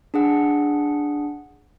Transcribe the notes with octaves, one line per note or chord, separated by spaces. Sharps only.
D4 G#4 F#5